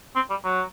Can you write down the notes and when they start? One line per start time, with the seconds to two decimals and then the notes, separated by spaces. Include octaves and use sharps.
0.15 C4
0.30 G3
0.44 F#3